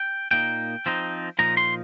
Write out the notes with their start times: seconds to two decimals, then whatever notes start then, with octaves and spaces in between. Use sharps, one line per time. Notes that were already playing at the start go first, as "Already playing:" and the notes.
Already playing: G5
0.31 A#2 A#3 D#4 G5
0.86 F3 C4 D#4
1.39 A#2 F3 D#4 A#5
1.57 C6